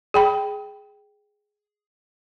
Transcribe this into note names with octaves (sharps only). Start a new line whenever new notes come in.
G#4 G5 B5